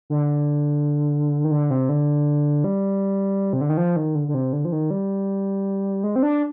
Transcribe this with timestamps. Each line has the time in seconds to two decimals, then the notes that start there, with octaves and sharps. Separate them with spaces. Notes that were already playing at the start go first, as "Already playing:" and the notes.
0.10 D3
1.44 D#3
1.51 D3
1.70 C3
1.89 D3
2.64 G3
3.53 C3
3.61 D3
3.69 D#3
3.77 F3
3.96 D#3
4.15 D3
4.28 D3
4.34 C3
4.53 D3
4.65 F3
4.72 D#3
4.91 G3
6.04 G#3
6.16 C4
6.23 D4